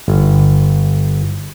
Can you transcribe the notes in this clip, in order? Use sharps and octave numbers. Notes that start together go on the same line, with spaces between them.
G1